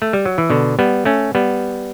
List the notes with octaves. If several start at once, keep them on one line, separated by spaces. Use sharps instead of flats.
A3
G3
F#3
E3
B2 D3
G3 B3
A3 C#4
G3 B3